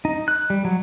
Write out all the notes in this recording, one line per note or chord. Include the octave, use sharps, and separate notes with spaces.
D#4
F#6
G3
F#3